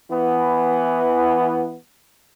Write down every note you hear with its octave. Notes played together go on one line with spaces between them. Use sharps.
E3 B3